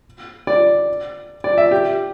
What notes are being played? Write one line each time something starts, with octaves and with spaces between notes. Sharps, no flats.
D5
D5
E5
G4